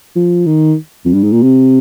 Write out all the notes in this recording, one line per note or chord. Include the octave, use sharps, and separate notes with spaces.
F3
D#3
F2
G2
G#2
A#2
C3